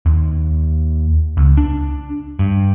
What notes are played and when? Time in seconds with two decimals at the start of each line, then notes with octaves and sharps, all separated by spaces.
0.06 D#2
1.37 C#2
1.57 D4
2.39 G2